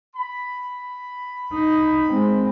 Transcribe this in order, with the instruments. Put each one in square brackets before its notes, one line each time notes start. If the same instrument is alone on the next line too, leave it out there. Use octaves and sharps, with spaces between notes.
[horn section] B5
[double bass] D#4
G#3 C4